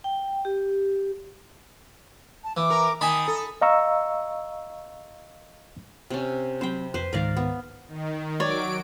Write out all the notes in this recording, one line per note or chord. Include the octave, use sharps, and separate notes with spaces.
G5
G4
A5
E3 D6
A#4
D#3 G#5 A5 B5 D#6
A4
D#5 F5 A#5 C#6 E6
C3 C#4
F#3 C4 C5 G5 B5
F2 B4 C5
C#2 G#2 D#3 A#4 D5 F5
B3
D#3
F#3 C#5 D5 D7